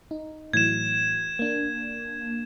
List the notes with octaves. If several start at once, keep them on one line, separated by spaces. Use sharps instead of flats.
D#4
A2 E3 F#3 G#6 E7
A#3 D4